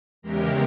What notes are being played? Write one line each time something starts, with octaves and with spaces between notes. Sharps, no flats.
E2 C#3 E3 G#3 G4 A#4